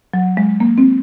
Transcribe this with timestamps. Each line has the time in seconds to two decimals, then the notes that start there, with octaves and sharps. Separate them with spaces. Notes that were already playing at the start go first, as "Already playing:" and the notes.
0.14 F#3
0.37 G#3
0.60 A#3
0.78 C4